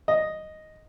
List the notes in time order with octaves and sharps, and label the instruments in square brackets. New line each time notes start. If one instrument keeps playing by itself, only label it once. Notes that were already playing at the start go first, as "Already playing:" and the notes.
[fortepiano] D#5